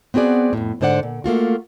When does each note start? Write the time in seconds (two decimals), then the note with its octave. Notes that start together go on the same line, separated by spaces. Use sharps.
0.14 B3 C4 F#4 G#4 D5
0.53 F2 A2
0.81 G#2 D3 C5 D5 F#5
1.03 A#2
1.24 A3 A#3 F4 F#4